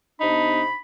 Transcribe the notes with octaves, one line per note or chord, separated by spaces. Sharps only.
C3 B3 D4 D#4 B5